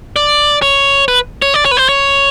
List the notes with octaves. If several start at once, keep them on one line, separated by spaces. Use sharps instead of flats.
D5
C#5
B4
C#5
D5
C#5
B4
C5
C#5